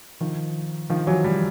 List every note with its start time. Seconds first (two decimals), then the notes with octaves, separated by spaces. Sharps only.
0.21 D#3 F3
0.90 D#3 F3
1.07 E3 F#3
1.24 F3 G3